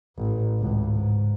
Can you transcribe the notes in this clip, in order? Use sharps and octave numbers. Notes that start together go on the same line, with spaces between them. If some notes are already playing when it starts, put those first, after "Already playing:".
A1
G#1 C#2
G#2